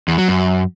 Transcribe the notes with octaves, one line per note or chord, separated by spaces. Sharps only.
E2
F#3
F#2